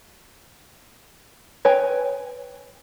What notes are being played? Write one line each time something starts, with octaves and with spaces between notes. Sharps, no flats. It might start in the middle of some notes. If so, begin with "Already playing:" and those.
B4 C#5 G5 G#5